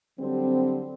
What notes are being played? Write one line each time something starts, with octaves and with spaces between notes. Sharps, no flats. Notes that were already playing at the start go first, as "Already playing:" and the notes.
D3 F#3 G3 C4